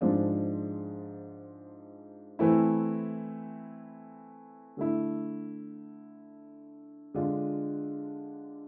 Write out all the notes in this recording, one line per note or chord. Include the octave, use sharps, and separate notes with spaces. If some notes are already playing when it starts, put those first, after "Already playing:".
G#2 F3 G#3 D4 F4
E3 A3 C4 E4
D3 A3 E4
D3 G#3 D4 F4